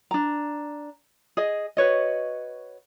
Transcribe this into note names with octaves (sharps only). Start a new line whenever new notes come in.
D4 A#5
G#4 D#5
F#4 B4 C#5 D#5